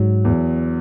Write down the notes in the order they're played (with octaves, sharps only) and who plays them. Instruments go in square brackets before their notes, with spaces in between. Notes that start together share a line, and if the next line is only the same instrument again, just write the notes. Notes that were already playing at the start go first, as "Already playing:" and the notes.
Already playing: [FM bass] G#2 [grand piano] F#3
[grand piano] E2